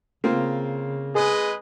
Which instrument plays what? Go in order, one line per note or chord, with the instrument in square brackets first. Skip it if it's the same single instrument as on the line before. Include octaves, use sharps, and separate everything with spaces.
[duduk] C#3 [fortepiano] A#3 C4 F4
[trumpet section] G#3 B4 D#5 [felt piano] G#4